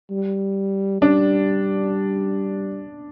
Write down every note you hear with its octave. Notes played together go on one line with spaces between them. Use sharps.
G3
G3 D4